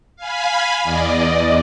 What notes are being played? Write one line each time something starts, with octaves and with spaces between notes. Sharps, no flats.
F5 G#5 B5
E2 D5 D#5